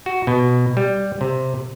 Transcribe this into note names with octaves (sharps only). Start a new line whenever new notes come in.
F#4
B2
G3
C3